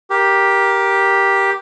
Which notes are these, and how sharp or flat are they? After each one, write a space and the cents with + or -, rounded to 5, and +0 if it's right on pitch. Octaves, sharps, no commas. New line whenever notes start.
G4 +0 A#4 +15